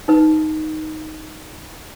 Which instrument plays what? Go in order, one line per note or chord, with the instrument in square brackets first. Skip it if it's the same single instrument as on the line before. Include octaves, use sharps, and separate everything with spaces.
[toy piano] D#4 B4